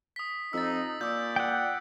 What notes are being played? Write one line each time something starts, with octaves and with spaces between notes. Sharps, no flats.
D#6 B6
F2 D#4 E6 A6
A#2 D5 E6 G6
F#5 G5